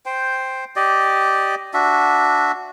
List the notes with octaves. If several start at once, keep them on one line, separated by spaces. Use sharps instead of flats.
C5 G5
G4 D5 D#5
D4 F#4 E5